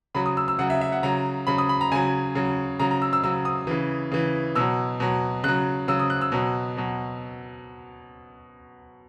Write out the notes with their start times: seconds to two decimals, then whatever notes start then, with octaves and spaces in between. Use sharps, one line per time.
0.15 C#3 F#3 B5
0.26 D#6
0.37 E6
0.48 E6
0.59 C#3 F#3 F#5
0.70 E5
0.81 E5
0.92 F#5
1.03 C#3 F#3 A#5
1.47 C#3 F#3 B5
1.58 D#6
1.69 B5
1.81 A#5
1.92 C#3 F#3 G#5
2.35 C#3 F#3
2.79 C#3 F#3 A#5
2.91 A#5
3.02 E6
3.13 E6
3.23 C#3 F#3 E6
3.45 D#6
3.67 C#3 E3
4.11 C#3 E3
4.55 B2 F#3 E6
5.00 B2 F#3
5.44 C#3 F#3 F#6
5.88 C#3 F#3 E6
5.99 D#6
6.10 F#6
6.21 E6
6.32 B2 F#3
6.77 B2 F#3